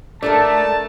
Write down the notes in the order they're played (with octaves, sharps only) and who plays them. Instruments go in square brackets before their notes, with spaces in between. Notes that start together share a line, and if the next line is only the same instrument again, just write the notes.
[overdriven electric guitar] A3 [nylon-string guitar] D4 A4 A#4 [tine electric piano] D5 [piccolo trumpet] A5